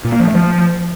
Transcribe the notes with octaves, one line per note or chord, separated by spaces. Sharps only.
A#2
A#3
F3
A3
F3